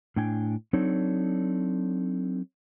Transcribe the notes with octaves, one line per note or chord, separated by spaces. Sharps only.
A2 D4 G5 G#5
F#3 C4 D4 D#4 A4 C#5